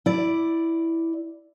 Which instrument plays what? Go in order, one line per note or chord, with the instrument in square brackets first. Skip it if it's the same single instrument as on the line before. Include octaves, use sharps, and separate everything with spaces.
[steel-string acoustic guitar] E4 D5